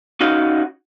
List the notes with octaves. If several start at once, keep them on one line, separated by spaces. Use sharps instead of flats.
C#4 D#4 F#4 F5